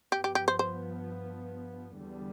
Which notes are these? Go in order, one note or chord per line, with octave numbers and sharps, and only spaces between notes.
G2 F3 B3 G4
G4
G4
C5
C5
E2 D3 G3 B3